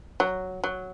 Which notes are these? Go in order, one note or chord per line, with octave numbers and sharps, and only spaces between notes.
F#3
F#3